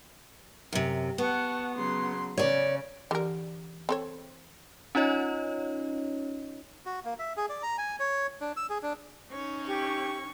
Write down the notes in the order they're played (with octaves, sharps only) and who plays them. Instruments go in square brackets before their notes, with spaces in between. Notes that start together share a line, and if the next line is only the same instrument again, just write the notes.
[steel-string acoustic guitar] F#2 C3
[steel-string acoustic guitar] B3 [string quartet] F#5 A5 C#6
[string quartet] C#3 F#3 C6
[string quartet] C#3 [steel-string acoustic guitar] C#5 D5
[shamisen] D3 A#4 [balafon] E3 G4
[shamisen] C4 A4 C#5
[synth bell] C#4 D#4 F4 C#5 D#5
[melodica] F#4
A#3
E5
G#4
D5
A#5
G#5
C#5
D4
E6
G#4
D4
[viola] C#4 D#4 [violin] C#5
[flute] G4 [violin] C#6